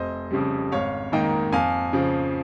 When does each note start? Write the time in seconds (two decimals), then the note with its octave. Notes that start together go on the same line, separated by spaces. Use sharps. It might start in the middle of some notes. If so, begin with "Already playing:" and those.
Already playing: F1 C5 D#5
0.31 F2 C#3 G3
0.72 G#1 C#5 F5
1.12 G#2 D#3 A#3 D#5 G5
1.52 F2 F5 G#5
1.93 C#3 F3